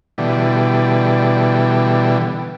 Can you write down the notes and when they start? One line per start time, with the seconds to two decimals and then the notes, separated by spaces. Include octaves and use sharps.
0.18 B2 D3 E3 G3